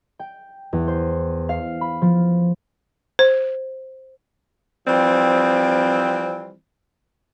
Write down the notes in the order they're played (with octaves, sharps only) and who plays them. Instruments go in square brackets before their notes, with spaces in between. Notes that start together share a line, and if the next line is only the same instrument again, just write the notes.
[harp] G5
E2
C5
F5
B5
F3
[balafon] C5
[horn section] E3 F3 G3 C4